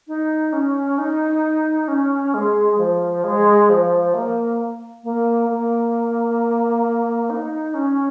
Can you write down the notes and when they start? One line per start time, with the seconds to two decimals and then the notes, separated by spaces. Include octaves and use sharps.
0.07 D#4
0.52 C#4
0.98 D#4
1.87 C#4
2.34 G#3
2.78 F3
3.24 G#3
3.69 F3
4.14 A#3
5.03 A#3
5.49 A#3
7.29 D#4
7.74 C#4